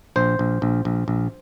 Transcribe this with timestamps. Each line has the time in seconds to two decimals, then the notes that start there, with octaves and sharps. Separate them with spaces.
0.16 A#1 C5
0.39 A#1
0.62 A#1
0.85 A#1
1.08 A#1